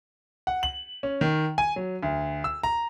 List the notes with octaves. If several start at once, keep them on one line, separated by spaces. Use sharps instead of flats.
F#5
F#7
C#4
D#3
G#5
F#3
D2
E6
A#5